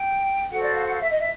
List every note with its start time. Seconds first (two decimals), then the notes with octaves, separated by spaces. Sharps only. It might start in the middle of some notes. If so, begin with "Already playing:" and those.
Already playing: G5
0.50 F#4 A4 C5 F#5
0.61 D5
0.72 F5
0.84 F#5
0.93 F5
1.01 E5
1.09 D#5
1.18 E5